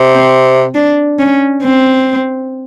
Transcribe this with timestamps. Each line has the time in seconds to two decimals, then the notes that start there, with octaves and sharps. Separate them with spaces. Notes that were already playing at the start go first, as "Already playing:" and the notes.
Already playing: C3
0.15 C4
0.75 D4
1.19 C#4
1.63 C4